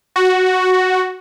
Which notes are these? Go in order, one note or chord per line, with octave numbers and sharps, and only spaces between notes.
F#4